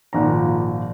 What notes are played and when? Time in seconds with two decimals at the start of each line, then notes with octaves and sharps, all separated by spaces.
0.13 G#1 A#2 F3 A#5